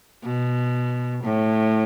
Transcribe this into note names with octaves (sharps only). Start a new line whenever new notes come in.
B2
A2